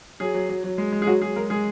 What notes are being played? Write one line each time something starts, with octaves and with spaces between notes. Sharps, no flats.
F#3 G#4
F#3
F#3
F#3
G#3
G#3
G#4
F#3 F#4
F#3 G#4
G#3 A#4
G#3 G#4